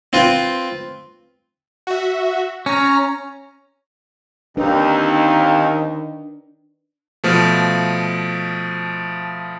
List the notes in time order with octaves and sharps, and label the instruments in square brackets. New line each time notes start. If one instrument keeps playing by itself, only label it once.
[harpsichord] C4 F4 B4
[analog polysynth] F#4 E5
[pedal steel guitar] C#4 [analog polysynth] A#5
[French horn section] D#2 [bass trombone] D#3 [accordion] C4 D#4 [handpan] D4 B4
[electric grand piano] B2 F3 A3